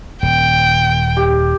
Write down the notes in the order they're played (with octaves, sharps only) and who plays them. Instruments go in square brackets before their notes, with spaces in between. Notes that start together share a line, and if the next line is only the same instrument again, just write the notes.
[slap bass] D#1 [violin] G5
[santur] G4